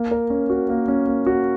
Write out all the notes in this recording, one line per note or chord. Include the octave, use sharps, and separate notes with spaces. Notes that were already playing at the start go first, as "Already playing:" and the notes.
Already playing: A#3
A#4
C#4
F#4
A#3
C#4
A#3
F#4